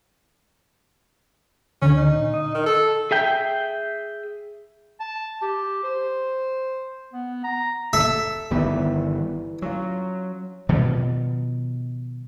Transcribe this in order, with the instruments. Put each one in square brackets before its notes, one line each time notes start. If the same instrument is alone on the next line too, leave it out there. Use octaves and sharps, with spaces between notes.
[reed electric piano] D2 D3 [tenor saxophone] C#4
[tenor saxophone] D#4
[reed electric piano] A#2
D#5 D#6
[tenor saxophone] D#3
A4
[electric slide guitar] G#4 E5 G5
[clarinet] A5
G4
C5
B3
A#5
[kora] A4 [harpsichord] E5
[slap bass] G1 D#3 B3 [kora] E3 G3
[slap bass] F#3 [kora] C#4 F4
[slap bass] B2 D#3 F3 G3